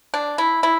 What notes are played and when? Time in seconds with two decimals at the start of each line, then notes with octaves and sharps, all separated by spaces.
0.14 D4
0.38 E4
0.63 E4